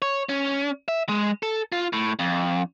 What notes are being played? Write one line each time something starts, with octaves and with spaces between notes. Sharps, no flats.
C#5
C#4
E5
G#3
A4
F4
A2
F2